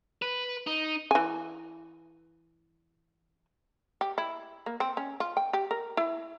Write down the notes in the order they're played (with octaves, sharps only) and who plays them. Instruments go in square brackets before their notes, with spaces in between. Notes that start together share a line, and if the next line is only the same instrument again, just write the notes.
[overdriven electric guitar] B4
D#4
[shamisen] E3 G#5
G4
E4
A#3
C4
C#4
F4
G5
G4
A#4
E4